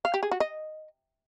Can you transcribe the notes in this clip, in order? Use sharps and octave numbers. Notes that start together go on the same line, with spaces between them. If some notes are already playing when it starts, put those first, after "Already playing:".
F5
G4
G#4
F#4
D#5